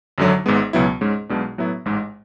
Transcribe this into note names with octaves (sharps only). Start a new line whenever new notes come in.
G#1 F#2 D3 F#3
G#1 G#2 G#3 B3
C#2 B2 F#3 B3 E4
G#2 G#3 C#4
B1 B2 G#3 D4
A2 F#3 B3 E4
A1 G#2 G#3